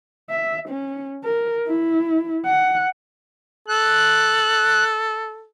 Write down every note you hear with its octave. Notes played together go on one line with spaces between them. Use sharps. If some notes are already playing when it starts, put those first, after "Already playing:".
E5
C#4
A#4
E4
F#5
A4 F#6